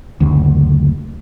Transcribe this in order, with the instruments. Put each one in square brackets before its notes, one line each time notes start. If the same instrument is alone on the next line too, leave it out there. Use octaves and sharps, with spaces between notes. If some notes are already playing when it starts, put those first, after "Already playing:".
[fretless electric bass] F#1 D2